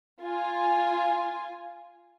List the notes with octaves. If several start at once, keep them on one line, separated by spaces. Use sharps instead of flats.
F4 G#5